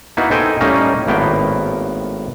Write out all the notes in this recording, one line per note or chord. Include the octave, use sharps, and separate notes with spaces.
A#3 B3 D#4 E4 F#4
D#4 A4 C5 G5 G#5
A2 G3 A#3 C#4 D#4
G#1 A2 A#3 B3 G5